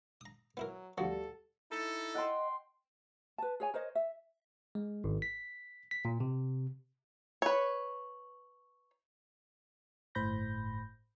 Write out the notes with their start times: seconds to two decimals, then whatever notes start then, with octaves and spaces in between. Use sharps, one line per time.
0.21 A#5 D#6
0.57 F#3 B3 E4 A#4
0.98 D2 F3 G3 F#4 A4
1.72 D#4 E4 A4
2.15 D#5 F#5 G5 C6
3.38 B4 A5
3.60 G#4 C#5 G#5
3.74 A#4 C5 C#5 D#5
3.95 E5
4.75 G#3
5.04 G#1
5.22 B6
5.91 B6
6.05 A#2
6.20 C3
7.42 B4 C#5
10.15 G1 A2 C5 B5 G6 A#6